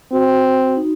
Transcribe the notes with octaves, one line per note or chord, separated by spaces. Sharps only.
C4 F#4
F#4
D#4